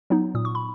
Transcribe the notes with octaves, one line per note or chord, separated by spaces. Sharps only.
F#3 B3 D#4
A#2 D#6
C#6
B5